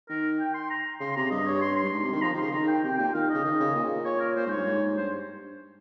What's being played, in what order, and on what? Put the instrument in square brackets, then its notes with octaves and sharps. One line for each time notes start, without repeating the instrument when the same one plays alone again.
[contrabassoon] D#3 [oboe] A#4
[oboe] G5
C6
A#5
[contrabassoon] C#3 [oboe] C6
[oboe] C6
[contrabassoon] C3 [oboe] A#5
[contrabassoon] G2 [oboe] D#5
[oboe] C#5
C6
C6
[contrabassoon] G2
G#2
C3
[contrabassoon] D#3 [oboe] C6
[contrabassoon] F3 [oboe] A#5
[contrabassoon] D#3
[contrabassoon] C#3 [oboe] C6
[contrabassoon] D#3 [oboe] A#5
[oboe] G5
[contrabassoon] C3 [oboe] G5
[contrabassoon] A#2 [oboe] G5
[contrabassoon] D#3 [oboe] F5
[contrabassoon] C#3 [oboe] D#5
[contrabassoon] D#3
C#3
A#2
[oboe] C#5
A#4
[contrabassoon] A#2 [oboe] C5
[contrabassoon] G#2 [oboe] C#5
[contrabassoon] G2
G#2
[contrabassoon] G2 [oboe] C5